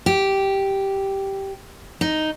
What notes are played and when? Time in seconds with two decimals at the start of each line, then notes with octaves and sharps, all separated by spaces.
0.06 G4
2.01 D#4